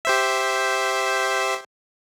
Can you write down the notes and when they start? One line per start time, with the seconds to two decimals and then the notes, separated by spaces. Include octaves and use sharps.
0.05 G4 C5 E5